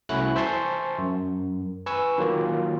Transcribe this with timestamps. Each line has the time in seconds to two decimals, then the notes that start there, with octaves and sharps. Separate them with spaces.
0.09 C2 A3 C#4 E4 F#4 F#6
0.36 C5 E5 G#5 A5 C6 C#6
0.99 F#2
1.86 B4 G#5 C#6 E6
2.18 D#3 F#3 A#3 F4